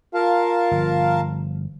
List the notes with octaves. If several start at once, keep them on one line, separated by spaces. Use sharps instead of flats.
F4 A#4 F5 A5
G1 F3